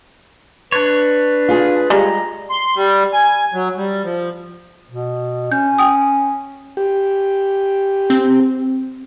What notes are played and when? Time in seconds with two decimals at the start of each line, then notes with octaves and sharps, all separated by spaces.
0.72 D4 B4 C#5
1.49 F4 G#4
1.90 G3 G#3 A#5
2.50 C6
2.75 G3
3.13 G#5
3.54 F#3
3.77 G3
4.04 F3
4.91 B2
5.52 C#4 G6
5.78 G5 D#6
6.77 G4
8.10 C4